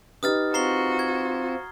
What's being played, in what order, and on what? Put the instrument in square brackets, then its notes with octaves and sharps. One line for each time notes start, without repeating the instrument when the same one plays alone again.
[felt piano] D#4 G4 B4 [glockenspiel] D#6 F6 A6
[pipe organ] C4 F4 [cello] F#4 [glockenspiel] A#5 C7 G7
[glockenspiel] G#6